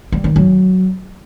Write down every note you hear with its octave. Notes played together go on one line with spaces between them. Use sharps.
G3
D#3
F#3